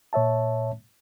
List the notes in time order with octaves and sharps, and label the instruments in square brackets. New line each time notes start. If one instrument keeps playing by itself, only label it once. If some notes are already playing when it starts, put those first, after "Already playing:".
[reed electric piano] A#2 C#5 E5 A5